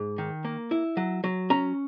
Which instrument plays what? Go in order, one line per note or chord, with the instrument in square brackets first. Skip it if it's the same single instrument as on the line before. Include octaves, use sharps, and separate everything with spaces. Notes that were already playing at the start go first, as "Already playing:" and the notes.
Already playing: [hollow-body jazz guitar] G#2
D#3
A#3
E4
F#3
F#3
C#4 A#5